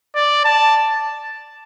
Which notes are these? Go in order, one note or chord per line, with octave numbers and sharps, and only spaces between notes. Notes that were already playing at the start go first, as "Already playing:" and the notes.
D5
A5